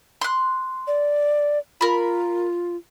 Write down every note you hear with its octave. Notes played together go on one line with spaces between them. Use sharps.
C6 F#6
D5
F4 A#4 B5